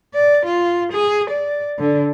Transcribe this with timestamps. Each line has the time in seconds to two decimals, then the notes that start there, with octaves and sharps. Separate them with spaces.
0.14 D5
0.46 F4
0.92 G#4
1.30 D5
1.79 D3